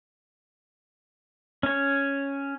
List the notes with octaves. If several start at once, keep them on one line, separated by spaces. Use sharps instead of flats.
C#4 C#5